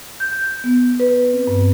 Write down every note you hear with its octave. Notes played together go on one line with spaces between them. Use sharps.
G6
B3
B4
C4
G2